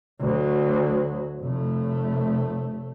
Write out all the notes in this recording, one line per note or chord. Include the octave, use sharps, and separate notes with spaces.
D2 F#3
F1 A3